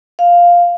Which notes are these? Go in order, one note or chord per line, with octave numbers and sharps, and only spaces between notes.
F5